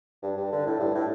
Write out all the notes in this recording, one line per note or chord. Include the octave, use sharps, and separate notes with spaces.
G2
G2
D3
A2
G2
A2